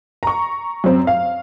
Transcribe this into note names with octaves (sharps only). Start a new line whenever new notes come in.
A#5 C#6
F#2 C4
F5